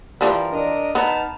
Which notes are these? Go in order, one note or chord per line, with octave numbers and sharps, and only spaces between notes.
E3 F3 G3 A#4
D4 A#4 D#5
B3 D#4 A5 F6